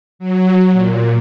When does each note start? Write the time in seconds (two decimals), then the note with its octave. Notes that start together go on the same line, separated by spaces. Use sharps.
0.19 F#3
0.72 A#2